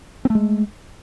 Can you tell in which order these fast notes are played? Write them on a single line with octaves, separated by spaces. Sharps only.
C4 A3 G#3